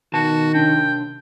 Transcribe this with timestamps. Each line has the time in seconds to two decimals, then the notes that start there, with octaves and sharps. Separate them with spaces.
0.14 B2 D#3 F#4 A5
0.55 C3 D4 G5